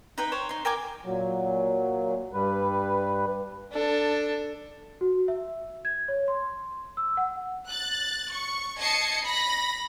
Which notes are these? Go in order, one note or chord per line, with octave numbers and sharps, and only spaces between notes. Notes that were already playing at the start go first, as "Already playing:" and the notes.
D#4 B4 G5
C5 C#5 G5
D#4 C6
A#4 G5 G#5 D6
A#2 F#3
G2 G3 B4
D4 A4
F#4
E5
G#6
C#5
C6
E6
F#5
F#6 A6
C#6
D#5 A5 G#6 C7 C#7
B5 A#6